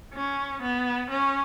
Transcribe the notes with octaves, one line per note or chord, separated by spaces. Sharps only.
C#4
B3
C#4